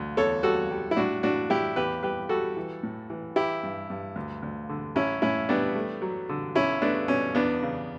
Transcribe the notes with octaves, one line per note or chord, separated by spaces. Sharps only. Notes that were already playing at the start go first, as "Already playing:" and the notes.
Already playing: D2
E2 A4 C#5
G3 F#4 A4
G3
E4
A2 D4 F#4
A2 D4 F#4
A2 E4 G4
E2 G4 B4
G3 G4 B4
G3 F#4 A4
E3
A2
E3
E3 E4 G4
G2
G2
D2
D2
D3
A1 C#4 E4
A2 C#4 E4
G3 B3 D4
A3
F#3
D3
B1 C#4 E4
A3 B3 D4
B2 C#4
E2 B3 D4
C#3